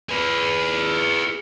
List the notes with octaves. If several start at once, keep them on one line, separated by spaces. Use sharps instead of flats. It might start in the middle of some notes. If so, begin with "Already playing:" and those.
G#4 B4